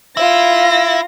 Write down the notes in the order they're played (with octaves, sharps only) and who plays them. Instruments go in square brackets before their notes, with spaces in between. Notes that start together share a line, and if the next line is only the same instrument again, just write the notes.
[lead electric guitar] E4 [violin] F4 A#6